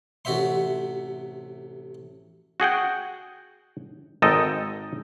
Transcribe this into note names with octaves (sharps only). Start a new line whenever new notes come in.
A1 C3 F#4 C5 E5 C6
F#4 G#4 F#5 G5
G#1 G#3 D#4 A4 D#5 G5